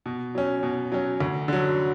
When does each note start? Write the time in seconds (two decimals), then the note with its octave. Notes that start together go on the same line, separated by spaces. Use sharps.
0.06 B2
0.35 F#3 C#4
0.63 B2
0.92 F#3 C#4
1.20 D2
1.48 D3 F#3